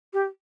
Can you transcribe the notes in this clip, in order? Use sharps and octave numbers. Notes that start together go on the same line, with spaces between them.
G4